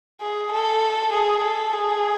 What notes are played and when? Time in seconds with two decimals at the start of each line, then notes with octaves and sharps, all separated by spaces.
0.21 G#4
0.52 A4
1.13 G#4
1.44 A4
1.74 G#4